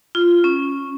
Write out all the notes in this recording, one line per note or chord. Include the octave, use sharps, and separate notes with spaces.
F4
C#4